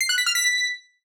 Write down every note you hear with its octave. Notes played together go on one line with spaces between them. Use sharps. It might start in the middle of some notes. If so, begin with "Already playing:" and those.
C7
F#6
B6
F6
B6